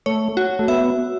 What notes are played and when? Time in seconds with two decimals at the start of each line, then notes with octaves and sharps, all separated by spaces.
0.06 A3 C#5
0.37 F#4
0.59 A3
0.68 B3 E5